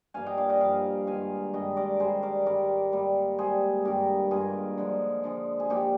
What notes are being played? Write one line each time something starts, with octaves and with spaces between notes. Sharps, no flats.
G2 F3 A#3 F5 G#5
D#5 G5
D5 F5
D#5 G5
G2 F3 A#3 F5 G#5
G2 D#3 G#3 F5 G#5
G2 D#3 G#3 D#5 G5
A#4 D5
G#2 D#3 G3 G#4 C5
A#4 D5
G#2 D#3 G3 A#4 D5
G#2 G3 A#3
G#2 G3 A#3 G#4 C5
G2 D#3 A#3 G4 A#4
G2 D#3 A#3 F4 G#4
D3 F3 G#3
D3 F3 G#3
G#4
A#2 F3 A#3 D#4 G4